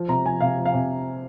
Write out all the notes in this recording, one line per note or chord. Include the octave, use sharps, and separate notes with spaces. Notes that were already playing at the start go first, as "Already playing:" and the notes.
Already playing: F3
C3 A#5
F3 G#5
C3 F5
F3
F5
C3